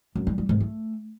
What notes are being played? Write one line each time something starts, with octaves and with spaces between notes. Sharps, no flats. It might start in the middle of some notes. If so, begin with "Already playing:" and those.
F#2
G3
G3
G#2
A3